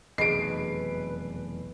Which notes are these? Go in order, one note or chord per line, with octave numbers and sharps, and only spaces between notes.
F1 B1 E2 G#4 B4 D#5 C7 D7